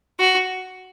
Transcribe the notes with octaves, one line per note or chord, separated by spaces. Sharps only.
F#4